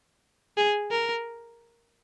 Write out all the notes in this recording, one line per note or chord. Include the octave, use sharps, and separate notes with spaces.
G#4
A#4